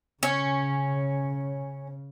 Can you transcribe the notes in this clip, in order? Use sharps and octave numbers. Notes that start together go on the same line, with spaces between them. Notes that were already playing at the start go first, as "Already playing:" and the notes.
C#3 C#4